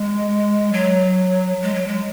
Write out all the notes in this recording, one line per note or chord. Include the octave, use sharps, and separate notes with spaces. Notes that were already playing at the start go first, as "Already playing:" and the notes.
Already playing: G#3
F#3
G#3
F#3
G#3